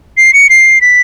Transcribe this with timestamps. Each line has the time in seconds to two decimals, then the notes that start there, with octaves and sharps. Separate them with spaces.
0.17 C7
0.34 C#7
0.50 C7
0.81 B6